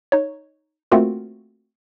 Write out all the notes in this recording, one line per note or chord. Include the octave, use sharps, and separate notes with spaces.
D#4 C#5
A3 A#3 C4 F4 F#4 A#4